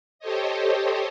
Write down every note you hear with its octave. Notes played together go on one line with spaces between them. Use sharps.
G4 A4 C5 C#5 D#5